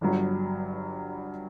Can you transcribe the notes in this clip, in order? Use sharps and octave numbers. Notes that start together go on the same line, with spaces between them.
G1 G2 F#3